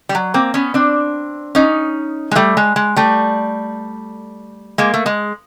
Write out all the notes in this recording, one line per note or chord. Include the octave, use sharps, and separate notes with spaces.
G3
F#3
A#3 C4
B3 C#4
C4 D4
C#4 D#4
G#3
G3 A3
G#3
G#3
G3 A3
G#3 A#3
A3
G#3